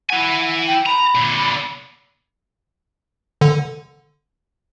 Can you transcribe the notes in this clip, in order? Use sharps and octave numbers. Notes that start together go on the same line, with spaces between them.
E4 F#5 G#5
G5
A#5 B5
A#2 D3
D3